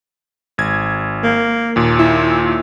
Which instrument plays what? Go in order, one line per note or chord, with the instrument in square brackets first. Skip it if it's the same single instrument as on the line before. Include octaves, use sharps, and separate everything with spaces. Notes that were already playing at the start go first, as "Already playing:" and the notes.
[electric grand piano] G#1 G#6
[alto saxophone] A#3
[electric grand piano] D#2 A#2
[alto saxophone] E4